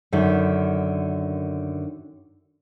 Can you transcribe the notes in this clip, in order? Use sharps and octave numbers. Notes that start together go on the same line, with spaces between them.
F#2 D3 D#3